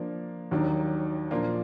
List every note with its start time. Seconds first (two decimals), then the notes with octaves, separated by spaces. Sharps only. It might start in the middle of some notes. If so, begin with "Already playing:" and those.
Already playing: F3 A#3 D4
0.51 D#2 D#3 F#3 D4
1.31 A#2 F3 A#3 D4 F4